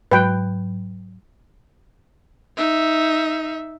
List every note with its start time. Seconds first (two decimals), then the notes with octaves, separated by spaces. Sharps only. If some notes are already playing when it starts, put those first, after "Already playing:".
0.11 G#2 F#3 B4 G5
2.57 D#4 E5